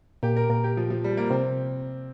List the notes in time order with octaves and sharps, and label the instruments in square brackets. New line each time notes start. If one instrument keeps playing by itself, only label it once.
[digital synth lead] A#2 [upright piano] G4
[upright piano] A#4
[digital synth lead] A#2 [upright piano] A#4
[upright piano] G4
F3
F3
G3
A#3
[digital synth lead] C3 [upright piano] C4